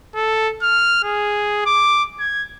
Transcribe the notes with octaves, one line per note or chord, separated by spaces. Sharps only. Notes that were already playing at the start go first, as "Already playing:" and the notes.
A4
F6
G#4
D6
G#6